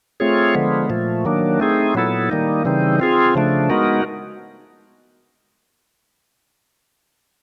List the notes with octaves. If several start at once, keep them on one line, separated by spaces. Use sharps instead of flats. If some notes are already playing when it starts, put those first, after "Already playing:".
A3 C4 F4 G#4 C#5
D3 F3 G#3 B3
A#2 F3 A3
D#3 F#3 A#3 D4
A3 C4 D#4 G#4
A#2 F#3 B3 E4 A4
D#3 G3 A#3 D#4
C#3 E3 G3 C4 D#4
C4 F4 G#4
C#3 F3 A3 D4
G#3 B3 D#4 F#4 A#4